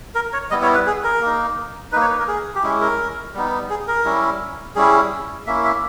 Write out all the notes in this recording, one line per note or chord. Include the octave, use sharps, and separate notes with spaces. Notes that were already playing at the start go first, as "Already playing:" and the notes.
A#4
C#5
G3 B3 E4 D#5
C#5
B4
G#4
A#4
A#3 D#4
A#3 D#4 B4
C#5
B4
A#4
G#4
G4
G#3 C#4 E4 G#4
A#4
G3 B3 D#4
G#4
A#4
G3 C#4 E4
G3 C#4 E4 G#4
A#3 C#4 E4 E5
E5